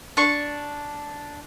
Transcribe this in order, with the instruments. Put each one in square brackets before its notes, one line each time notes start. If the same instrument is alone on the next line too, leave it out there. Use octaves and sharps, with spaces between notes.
[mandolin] D4 C#6